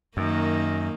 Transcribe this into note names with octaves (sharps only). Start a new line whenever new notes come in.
F#2 D#3 A#3